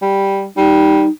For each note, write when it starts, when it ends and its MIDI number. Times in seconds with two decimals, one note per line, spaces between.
0.02 0.46 55
0.57 1.05 55
0.57 1.09 63